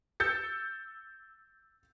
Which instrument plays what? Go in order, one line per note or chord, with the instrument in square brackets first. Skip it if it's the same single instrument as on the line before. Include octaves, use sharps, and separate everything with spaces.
[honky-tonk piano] E6 G6 A6 C#7